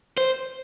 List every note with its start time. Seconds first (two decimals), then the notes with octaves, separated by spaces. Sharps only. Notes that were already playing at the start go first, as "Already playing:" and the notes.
0.18 C5